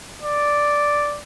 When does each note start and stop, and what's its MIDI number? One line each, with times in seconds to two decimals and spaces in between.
0.22 1.20 74